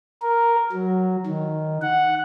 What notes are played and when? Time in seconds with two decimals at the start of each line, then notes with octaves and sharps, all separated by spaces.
0.22 A#4
0.72 F#3
1.27 D#3
1.82 F#5